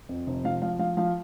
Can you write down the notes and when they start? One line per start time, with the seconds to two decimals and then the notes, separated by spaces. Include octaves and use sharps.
0.09 F2
0.27 F1
0.44 F3 F5
0.62 F3 F5
0.79 F3 F5
0.97 F3 F5